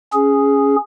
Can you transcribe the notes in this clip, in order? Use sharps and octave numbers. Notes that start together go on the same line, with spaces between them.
C#4 G#4